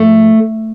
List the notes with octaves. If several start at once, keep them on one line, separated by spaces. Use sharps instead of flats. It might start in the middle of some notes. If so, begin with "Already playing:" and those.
Already playing: G#2 F3 A3